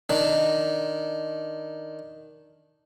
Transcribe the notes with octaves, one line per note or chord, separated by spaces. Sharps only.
D#3 D4